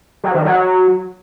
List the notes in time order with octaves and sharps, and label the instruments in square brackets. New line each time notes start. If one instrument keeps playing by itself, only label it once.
[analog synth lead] F#3
D#3
F#3